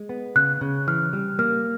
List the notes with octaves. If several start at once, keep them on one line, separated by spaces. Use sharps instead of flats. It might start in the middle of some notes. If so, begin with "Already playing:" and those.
Already playing: G#3
B3
C#3 F#6
C#3
E3 F6
G3
A#3 F6